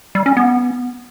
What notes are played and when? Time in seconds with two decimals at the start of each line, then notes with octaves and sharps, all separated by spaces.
0.15 G3
0.26 C#4
0.37 B3